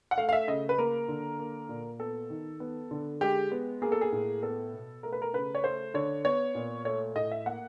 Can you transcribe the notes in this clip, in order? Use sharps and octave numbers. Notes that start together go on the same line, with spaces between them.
F#5
A3 F5
F5
E5
C#3 D#5
B4
A#3 A#4
D3
A#3
A#2
B3 A4
D#3
B3
D3
G#3 G4
B3
A#3 G#4
A4
G#4
A2
B3 A4
B2
A3 A#4
B4
A#4
C#3 B4
C#5
A3 C5
D3 C#5
B3 C#5
A#2
A3 C#5
A2 D#5
E5
A#3 F#5